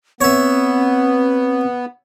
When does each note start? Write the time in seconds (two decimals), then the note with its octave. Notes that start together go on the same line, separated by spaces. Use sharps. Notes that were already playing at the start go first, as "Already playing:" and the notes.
0.21 B3 C4 C#5 E5